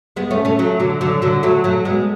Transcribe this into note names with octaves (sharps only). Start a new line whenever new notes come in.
G#3 B3
A3 C#4
A3 C#4
F#3 A3
D3 F#3
D3 F#3
D3 F#3
F#3 A3
F#3 A3
G#3 B3